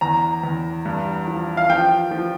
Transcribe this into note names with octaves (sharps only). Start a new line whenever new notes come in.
E2 A#5
E2
G2
F3
F5
F3 G5
F3